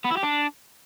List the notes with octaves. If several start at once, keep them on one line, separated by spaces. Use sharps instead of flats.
B3
E4
G4
D4